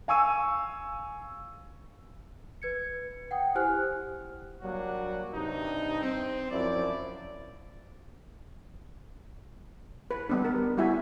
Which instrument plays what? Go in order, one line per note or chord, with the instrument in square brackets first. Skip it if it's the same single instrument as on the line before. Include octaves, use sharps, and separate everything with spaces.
[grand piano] F5 G#5 C#6 E6 D#7
[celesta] B4 G#6 C#7
F#5 G5 D#6
E4 G4 C5 G#5 F6 F#6
[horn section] F#3 G3 A#3 D4 F#4
G2 C3 D#4
C4
F#2 F3 E4 D5
[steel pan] B4
G3 B3 D4
A#4
G3 E4 F#4 E5 F#5 G#5